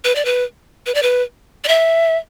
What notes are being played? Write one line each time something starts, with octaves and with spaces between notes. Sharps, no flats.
B4
D5
B4
B4
D5
B4
D5
E5